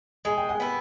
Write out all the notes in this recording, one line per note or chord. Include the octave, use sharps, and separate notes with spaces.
G#3 G#5
G5
F#5 G#5
B3 E4